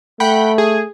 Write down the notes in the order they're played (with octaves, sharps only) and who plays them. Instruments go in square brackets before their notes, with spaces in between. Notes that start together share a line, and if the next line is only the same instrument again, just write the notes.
[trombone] A3 [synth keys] F#5 G5 B5
[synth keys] G#4